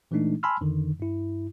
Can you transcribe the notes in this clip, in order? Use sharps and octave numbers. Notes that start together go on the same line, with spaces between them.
A#2 E3 G#3 A3 D4 D#4
G#5 A5 B5 C6 E6 F6
F2 D3 D#3
G2 E4